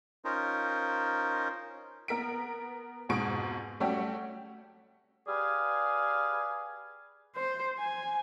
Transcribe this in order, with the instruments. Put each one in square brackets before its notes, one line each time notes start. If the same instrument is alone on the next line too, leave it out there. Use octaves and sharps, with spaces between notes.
[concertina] C#4 D#4 F4 A#4 C5
[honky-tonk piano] B3 A#4 B6 D7
F2 G#2 B2 G#4 C#6 D7
G3 A3 C#4 F#4 G4
[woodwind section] G4 G#4 B4 D5 F5 G#5
[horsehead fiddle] C5
G#5